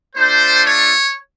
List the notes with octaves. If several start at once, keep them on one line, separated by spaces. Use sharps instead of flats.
A3 D4 F4 C5
C#5